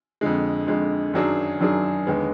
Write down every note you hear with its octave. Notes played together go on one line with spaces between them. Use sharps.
F2 D3 G#3
F2 D3 G#3
F#2 D#3 F#3 D4 G#4
F#2 D#3 F#3 D4 G#4
D#2 D3 G#3 B3